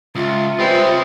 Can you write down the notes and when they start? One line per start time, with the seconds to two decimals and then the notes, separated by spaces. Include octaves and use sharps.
0.15 C#2 F4 E5
0.59 C#3 G3 G#3 C4 B4